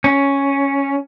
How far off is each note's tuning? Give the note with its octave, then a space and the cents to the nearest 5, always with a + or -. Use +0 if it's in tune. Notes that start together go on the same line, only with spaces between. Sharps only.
C#4 +0